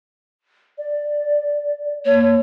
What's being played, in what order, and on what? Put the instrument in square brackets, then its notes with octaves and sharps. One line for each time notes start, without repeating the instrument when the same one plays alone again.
[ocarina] D5
[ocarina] A#3 [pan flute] C#5